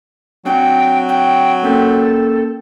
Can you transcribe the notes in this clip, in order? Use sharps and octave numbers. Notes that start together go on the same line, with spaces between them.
F#3 C4 D4 G5
G5
A#3 C#4 A4 G5